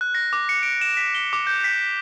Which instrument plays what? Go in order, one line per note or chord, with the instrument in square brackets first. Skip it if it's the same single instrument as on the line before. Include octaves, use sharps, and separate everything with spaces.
[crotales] F#6
A#6
D6
C#7
D7
E7
B6
G7
D6
G6
B6